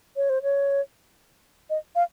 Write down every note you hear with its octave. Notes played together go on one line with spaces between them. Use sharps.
C#5
C5
C#5
D#5
F5